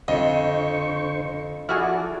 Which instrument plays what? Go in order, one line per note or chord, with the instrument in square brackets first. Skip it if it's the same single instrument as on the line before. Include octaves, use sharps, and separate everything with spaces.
[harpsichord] F2 [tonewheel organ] D3 C5 C#6 [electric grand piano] D#5
[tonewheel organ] F3 A4 D5 [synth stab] E4 F#4 G#4 [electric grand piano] F6